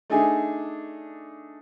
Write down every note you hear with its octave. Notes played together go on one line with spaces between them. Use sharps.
A3 D4 D#4 G#4 G#5